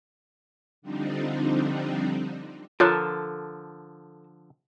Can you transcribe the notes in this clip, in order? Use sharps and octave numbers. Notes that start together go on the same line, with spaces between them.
D3 F3 G3 C4 D4 D#4
D3 F3 F4 A4 A#4 C#5 F#6